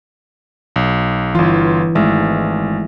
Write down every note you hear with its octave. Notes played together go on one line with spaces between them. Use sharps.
B1
G1 E3 F4
G#1 G#3 A3 E5